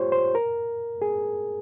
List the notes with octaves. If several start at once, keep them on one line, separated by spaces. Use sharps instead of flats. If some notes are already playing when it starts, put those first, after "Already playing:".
Already playing: F4 G4 C5 C#5
C5
A#4
G#4